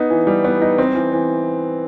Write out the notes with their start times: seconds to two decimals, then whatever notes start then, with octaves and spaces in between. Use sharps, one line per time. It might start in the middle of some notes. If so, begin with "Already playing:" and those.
Already playing: B3 D#4
0.10 E3
0.27 G3
0.44 B3
0.62 D#4
0.78 C4
0.95 E3
1.12 E3